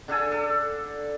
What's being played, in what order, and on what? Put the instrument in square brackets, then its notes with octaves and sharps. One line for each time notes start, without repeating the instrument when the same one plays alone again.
[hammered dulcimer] D3 D4 A4 G#5
A4